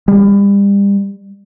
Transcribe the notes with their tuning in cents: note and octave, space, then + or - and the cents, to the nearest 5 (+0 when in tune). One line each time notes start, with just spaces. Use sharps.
G3 +35